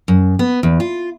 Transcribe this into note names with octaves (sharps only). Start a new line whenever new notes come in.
F#2
B3
E2
F4